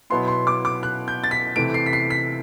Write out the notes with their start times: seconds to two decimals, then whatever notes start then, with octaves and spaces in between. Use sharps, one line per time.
0.10 B2 F#3 B3 E4 C6
0.28 C6
0.47 D6
0.65 D6
0.83 F#6
1.08 G6
1.24 A6
1.31 B6
1.55 C3 E3 A3 D7
1.74 C7
1.86 B6
1.93 C7
2.10 B6